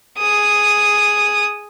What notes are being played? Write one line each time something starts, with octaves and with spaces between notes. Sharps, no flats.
G#4 D#6